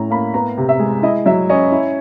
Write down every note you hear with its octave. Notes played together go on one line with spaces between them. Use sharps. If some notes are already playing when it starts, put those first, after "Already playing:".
Already playing: A2 C#4 A#5
A#3 B5
B3 A#5
C3
E5
G#3
E4 D#5
F#3 E5
C#4 D#5
E4